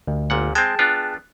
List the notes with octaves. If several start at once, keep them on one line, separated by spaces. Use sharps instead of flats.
D2
G1 A#2 F#5
G#3 C4 G#4 G5 A5
B3 D4 F4